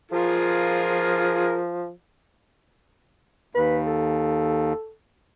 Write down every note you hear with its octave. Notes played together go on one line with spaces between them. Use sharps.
F3 F4 G#4 A#4
D#2 B4
A4